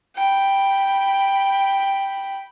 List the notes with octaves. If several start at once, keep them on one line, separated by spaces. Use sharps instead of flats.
G5 B5